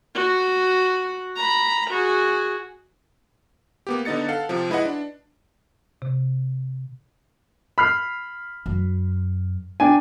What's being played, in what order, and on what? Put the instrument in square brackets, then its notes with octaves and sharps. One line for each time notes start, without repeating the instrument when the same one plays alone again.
[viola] F#4
A#5 B5
F#4 G#4
[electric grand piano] A#3 B3 G4
D3 B3 D#4 D#5 A6 C#7
A4 F5 F#5
C3 F3
G#3 E4 B4 D#5 F#5
D4
[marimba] C3
[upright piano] B5 F6 C7
[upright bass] F#2
[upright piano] D4 G5 G#5